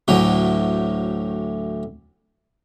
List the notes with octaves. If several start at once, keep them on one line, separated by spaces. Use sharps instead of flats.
D2 A2 D3 F#3